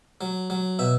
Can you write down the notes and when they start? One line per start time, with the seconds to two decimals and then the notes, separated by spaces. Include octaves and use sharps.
0.21 F#3
0.50 F#3
0.79 B2 E5